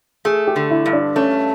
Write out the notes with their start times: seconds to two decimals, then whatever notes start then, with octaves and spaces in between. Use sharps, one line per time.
0.25 A3 G#4
0.47 G4
0.56 D3
0.71 E4
0.86 G2
0.93 D4
1.16 A3 C#4